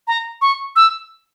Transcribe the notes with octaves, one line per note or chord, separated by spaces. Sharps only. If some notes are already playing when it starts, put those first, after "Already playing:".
A#5
C#6
E6